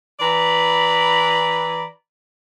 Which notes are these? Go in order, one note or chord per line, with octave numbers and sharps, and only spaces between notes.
E3 B4 D5 A#5 B5